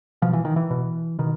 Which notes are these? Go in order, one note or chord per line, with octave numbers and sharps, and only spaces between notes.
B2 F3
E3
D#3
E3
B2
B2 D#3